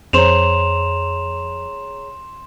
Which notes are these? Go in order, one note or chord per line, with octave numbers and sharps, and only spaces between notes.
F2 C4 G#4 C#5 A#5 C6 E7 F7